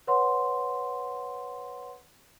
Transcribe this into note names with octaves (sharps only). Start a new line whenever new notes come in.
B4 C#5 F#5 C6